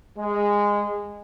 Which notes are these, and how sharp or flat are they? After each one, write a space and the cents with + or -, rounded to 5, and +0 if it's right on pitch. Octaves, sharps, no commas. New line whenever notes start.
G#3 -15